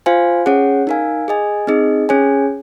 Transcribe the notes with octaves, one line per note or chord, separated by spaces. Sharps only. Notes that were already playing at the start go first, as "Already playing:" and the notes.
F4 C5 F5 G#5
C#4 G#4 C#5 F#5
D#4 A#4 F5 G#5
G#4 D#5 G#5
C4 D#4 G#4 D#5
C#4 G#4 C#5 G#5